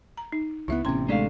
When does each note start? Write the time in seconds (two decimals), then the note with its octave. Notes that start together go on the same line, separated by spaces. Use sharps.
0.17 A#5
0.32 D#4
0.68 C#2 F3 B3 E4 E5
0.85 A1 C3 B3 C#4 C6
1.09 G#3 A3 D4 D5 F5